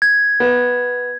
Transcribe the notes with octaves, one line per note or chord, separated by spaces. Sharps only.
G#6
B3